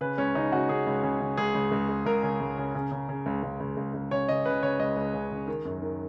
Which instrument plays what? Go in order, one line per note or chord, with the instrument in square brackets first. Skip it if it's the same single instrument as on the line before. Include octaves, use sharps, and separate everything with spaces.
[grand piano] C#3 B4
C#2 C#4
C#3 D#4
C#3 F#4
C#3 G#4
C#2
C#3
C#3
C#2 G#4
C#2
C#2
C#2
C#2 A#4
C#3
C#2
C#3
C#3
C#3
C#3
C#2
C#2
C#2
C#2
C#2
C#3 C#5
C#3 D#5
C#3 B4
C#3 C#5
C#2 D#5
C#2
C#3
C#3
D#3
F#2
D#3